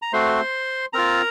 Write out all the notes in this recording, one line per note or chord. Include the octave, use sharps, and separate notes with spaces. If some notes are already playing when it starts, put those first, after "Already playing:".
A#5
A3 C4 F#4 C5 C6
C4 F4 A#4 A#5